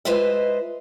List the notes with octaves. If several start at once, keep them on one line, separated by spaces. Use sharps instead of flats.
G#3 F4 B4 C5 D#5 E5